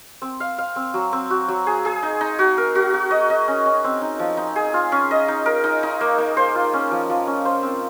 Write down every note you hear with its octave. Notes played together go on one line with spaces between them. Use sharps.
C4
F5
F5
C4
F#3
C4
F#4
F#3
G#4
G#4
D#4
D#4
F#4
A#4
F#4
F#4
D#5
D#5
C#4
C#4
C4
D#4
F3
D#4
G#4
F4
C#4
D#5
D#4
A#4
D#4
D#4
A#3
A#3
C5
F4
C#4
F3
F3
C#4
C5
C4